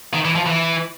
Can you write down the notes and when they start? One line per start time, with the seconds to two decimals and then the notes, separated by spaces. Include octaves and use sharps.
0.13 D#3
0.25 E3
0.35 F3
0.46 E3